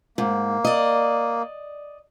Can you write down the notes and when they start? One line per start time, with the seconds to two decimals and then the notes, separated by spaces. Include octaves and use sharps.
0.18 G#2 A#3
0.65 D5 D#5